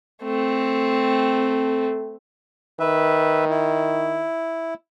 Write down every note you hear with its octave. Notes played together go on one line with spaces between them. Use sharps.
A3 C4
D#3 B4 E5
E4